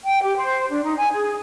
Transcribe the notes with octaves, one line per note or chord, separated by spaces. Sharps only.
G5
G4
C5
D4
D#4
G#5
G#4